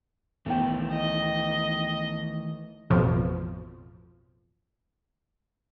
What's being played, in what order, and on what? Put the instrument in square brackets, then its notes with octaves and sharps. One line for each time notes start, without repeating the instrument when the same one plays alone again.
[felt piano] B1 G5 [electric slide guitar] D#3 E3 A3
[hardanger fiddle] D#5
[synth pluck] A1 F2 B2 F3